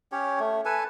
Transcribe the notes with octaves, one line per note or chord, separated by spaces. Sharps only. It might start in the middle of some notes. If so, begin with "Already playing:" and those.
C#4 G4 C#5
A3
A4 B4 G#5 A5